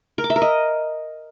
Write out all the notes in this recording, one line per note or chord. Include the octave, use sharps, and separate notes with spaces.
A#4
D6
E5
A#4
D#5